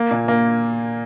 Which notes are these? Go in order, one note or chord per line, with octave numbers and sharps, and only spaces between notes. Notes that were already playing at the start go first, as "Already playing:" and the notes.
Already playing: A#3
A#2
A#3